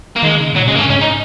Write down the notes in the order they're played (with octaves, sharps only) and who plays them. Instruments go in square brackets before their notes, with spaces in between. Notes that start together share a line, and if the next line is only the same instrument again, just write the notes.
[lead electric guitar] A#3
[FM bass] D#3 [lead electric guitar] G#3
[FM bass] C#3
G#2
[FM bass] A#2 [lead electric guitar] F#3
[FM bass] C#3 [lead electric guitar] G#3
[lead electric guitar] A#3
[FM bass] G#2 [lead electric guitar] C#4
[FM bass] G#2 [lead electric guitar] C#4
[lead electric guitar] D#4